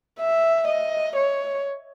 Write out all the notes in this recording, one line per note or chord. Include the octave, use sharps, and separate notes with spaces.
E5
D#5
C#5